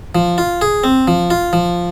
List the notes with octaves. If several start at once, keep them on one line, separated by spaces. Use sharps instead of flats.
F3
F4
G#4
C4
F3
F4
F3